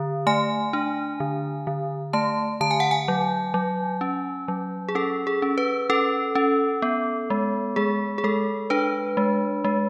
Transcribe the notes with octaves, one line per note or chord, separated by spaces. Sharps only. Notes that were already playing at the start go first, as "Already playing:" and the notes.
Already playing: D3
A3 G#5
D4
D3
D3
A3 A5
D3 A5
G#5
F#5
G#5
F#3
F#3
C#4
F#3
G#4
C#4 A4
G#4
C#4
B4
C#4 A4
C#4
B3
G#3
G#3 G#4
G#4
G#3 A4
D4 B4
G#3
G#3